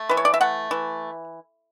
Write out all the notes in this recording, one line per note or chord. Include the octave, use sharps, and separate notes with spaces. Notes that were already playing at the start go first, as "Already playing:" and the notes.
Already playing: A3
E3 B4
C#5
D5
E5
A3 F#5
E3